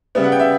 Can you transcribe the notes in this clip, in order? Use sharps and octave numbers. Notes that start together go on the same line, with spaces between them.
C#3 G3 B3 E5
F#5
G5
E5